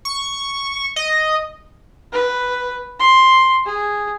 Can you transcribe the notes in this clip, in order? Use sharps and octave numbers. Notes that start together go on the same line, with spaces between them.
C#6
D#5
B4
C6
G#4